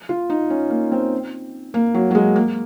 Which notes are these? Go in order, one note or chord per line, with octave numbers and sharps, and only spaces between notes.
F4
D#4
C#4
A#3
C4
A#3
F#3
F#3
G#3
A#3